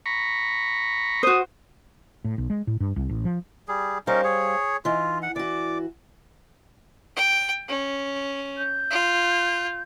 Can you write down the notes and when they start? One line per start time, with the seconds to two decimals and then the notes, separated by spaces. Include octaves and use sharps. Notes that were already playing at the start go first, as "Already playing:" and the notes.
0.06 A#5 B5 C#6
1.23 F#4 C5 D#6
2.24 A2
2.38 B1
2.50 G#3
2.67 A2
2.80 G2
2.96 C2
3.09 A1
3.25 F3
3.68 G3 G#4
4.07 G3 C#4 D#4 A#4 C5 F5
4.24 G#4 C#5
4.85 E3 D#4 F4
5.22 F#5
5.36 E3 F#4 D5 D6
7.16 G5
7.68 C#4
8.58 G6
8.90 F4